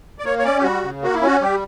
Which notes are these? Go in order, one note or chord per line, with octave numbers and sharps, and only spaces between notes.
D5
A#3 C#5
C#5
C#4 D5
G4
G3 F#4
C#3
A#3 F#4
E4
C#4 F#4
G3 G4